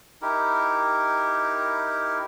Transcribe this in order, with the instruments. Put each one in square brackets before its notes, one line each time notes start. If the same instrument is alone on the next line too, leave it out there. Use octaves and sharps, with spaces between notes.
[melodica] D#4 E4 G4 A#4